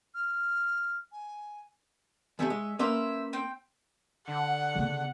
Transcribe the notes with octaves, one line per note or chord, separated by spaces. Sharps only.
F6
G#5
E2 C3 A3 C#5 E5 G#5
G#3
A#3 C#4 B4 C5 E5
C4 G5
D3 F#5
C#3 B3